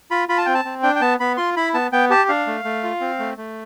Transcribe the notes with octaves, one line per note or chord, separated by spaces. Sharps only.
F4 B5
F4 B5
A5
C4 G5
A5
C4
D4 G5
G5
B3 A5
B3 B5
F4 C6
E4 B5
B3 A5
B3 G5
G4 A5
D4 F5
A3
A3
F4
C4
A3
A3